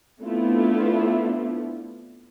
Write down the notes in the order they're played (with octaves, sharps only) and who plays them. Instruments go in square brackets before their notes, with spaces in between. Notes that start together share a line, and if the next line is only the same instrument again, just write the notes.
[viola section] A3 B3 C4 D4 E4 F4